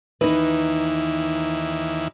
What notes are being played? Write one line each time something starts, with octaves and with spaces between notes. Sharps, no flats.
D#2 E3 D#4 B4